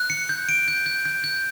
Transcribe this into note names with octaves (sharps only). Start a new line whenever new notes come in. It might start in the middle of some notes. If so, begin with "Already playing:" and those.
Already playing: F#6
C#7
G6
D7
G6
G6
G6
G6